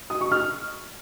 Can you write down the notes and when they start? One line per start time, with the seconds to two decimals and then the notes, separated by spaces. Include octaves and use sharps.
0.10 D#6
0.21 C#6
0.32 F6